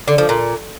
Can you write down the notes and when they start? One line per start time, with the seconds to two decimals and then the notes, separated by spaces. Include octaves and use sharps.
0.08 D3
0.18 F3
0.29 A#2